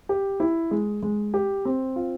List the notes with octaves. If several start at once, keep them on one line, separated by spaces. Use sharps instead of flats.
G4
E4
G#3
G#3
G4
C4
F4